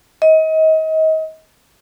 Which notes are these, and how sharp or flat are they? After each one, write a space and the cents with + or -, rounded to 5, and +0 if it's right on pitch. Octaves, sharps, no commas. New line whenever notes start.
D#5 +30